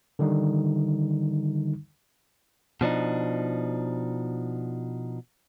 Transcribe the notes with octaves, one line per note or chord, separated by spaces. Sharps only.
D3 D#3 G3 D#4
B2 F3 D4 D#4